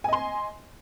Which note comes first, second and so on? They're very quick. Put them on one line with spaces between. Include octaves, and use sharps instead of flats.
G#5 D#5 C6